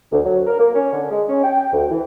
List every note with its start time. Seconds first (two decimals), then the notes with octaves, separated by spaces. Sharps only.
0.12 D2
0.25 F#3
0.46 A#4
0.59 A#3
0.75 C#4
0.93 D3
1.10 G#3
1.29 C#4
1.43 G5
1.72 D2
1.90 E3